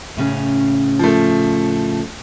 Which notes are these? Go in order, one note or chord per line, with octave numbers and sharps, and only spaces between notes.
A2 C#3 C#4
F3 A3